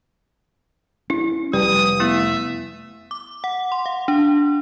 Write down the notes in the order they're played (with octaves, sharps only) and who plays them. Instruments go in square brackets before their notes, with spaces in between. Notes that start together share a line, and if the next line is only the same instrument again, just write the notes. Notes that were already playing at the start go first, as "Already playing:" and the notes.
[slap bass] C#4 [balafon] E4
[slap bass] F1 [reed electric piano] G3 [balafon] B4 [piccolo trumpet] D#6
[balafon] A3 B3 E4 [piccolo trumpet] E5
[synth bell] D6
F#5
C6
F5
D4